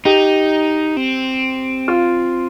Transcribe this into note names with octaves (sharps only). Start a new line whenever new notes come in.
D#4 G4
C4
F4